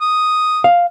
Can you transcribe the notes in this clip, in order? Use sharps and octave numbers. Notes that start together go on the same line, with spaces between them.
D#6
F5